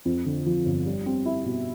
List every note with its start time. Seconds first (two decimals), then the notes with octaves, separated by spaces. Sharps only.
0.05 F2
0.26 D3
0.46 F3
0.66 G1
0.86 G3
1.06 C4
1.26 E4
1.45 B2